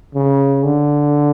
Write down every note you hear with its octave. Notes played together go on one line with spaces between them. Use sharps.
C#3
D3